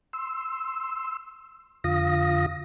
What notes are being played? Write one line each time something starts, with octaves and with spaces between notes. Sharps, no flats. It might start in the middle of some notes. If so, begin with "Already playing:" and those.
C6 E6
F2 D3 F4 F5 D#6 A#6